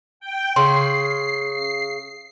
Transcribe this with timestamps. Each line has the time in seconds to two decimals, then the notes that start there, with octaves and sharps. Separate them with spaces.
0.20 G5
0.56 C#3 C6 C7